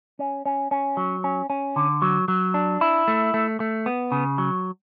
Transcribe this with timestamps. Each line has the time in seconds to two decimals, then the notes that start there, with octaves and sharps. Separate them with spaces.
0.19 C#4
0.46 C#4
0.71 C#4
0.97 F#3
1.24 C#4
1.50 C#4
1.76 D3
2.02 F#3
2.28 F#3
2.54 D4
2.81 E4
3.08 A3
3.34 A3
3.60 A3
3.86 B3
4.12 C#3
4.38 F#3